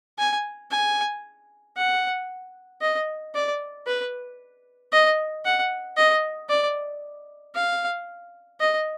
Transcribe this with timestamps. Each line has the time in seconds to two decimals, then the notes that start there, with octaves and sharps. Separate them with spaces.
0.19 G#5
0.71 G#5
1.77 F#5
2.81 D#5
3.34 D5
3.87 B4
4.92 D#5
5.45 F#5
5.97 D#5
6.49 D5
7.55 F5
8.60 D#5